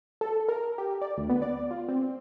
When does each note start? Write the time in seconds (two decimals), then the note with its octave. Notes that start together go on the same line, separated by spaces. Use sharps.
0.21 A4
0.48 A#4
0.78 G4
1.02 D5
1.17 D2
1.30 B3
1.42 D5
1.71 F4
1.89 C4